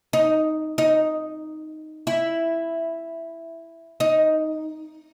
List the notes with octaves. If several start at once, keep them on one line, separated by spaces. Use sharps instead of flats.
D#4
D#4
E4
D#4